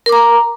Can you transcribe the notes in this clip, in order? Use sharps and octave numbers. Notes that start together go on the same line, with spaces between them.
A#4 A#5 D6